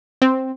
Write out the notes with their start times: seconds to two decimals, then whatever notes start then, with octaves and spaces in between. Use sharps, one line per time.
0.22 C4